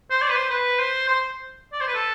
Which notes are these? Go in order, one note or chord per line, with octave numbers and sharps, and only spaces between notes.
C5
D5
B4
C5
B4
C5
C5
D5
C5
B4
A4